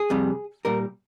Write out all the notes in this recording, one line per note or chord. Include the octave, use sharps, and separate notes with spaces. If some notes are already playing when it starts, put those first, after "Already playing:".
Already playing: G#4
F2 C3 G3
A#2 G3 A#4